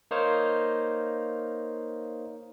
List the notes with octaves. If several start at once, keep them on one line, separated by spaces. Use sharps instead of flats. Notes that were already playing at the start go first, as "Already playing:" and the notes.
A#3 D#4 C5 C#5 F5